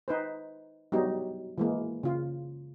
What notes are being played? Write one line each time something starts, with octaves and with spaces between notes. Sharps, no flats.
D#4 B4 C5
F#3 G3 B3 D#4
E3 G#3 A#3
C#3 F4